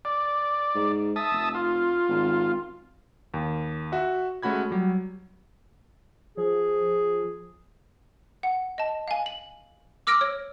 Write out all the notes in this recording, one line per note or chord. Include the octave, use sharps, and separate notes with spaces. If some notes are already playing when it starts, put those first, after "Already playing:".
D5
G#2
E5 A5 D#6
F1
F4
G#1
D#2
F#4 E5
G#3 A3 C#4 F#4 B5 G#6
F#3 G3
F3 G#4
F#5
D#5 A5
F5 G#5
F#7
D6 E6 F6 A#6 D7
C#5